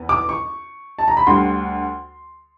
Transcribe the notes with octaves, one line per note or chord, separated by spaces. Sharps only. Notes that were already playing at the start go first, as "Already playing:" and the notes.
Already playing: E2 B3
D6
C#6
A5
A#5
B5
D2 D3 G3 C6